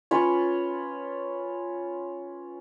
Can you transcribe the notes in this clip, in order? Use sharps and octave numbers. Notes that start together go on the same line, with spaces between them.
C#4 F4 B4 C#5